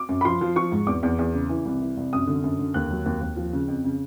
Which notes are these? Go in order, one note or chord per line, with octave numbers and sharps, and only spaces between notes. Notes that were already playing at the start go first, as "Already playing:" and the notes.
Already playing: D6
F#2
B5
F3 C6
F3
F3 C#6
G#2
E2 D6
E2
E2
C#3
E3
C2
E3
C2
F#2 D#6
D3
F#2
D3
D#2 F#6
F#3
D#2
D#2
F3
C#3
F2
C#3